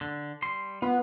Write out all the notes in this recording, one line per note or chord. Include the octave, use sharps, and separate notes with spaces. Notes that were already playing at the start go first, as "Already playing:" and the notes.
D3
G3 C6
B3 F4